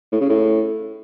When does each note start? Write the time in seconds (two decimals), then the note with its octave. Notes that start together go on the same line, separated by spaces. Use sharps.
0.12 A2
0.21 C#3
0.29 A2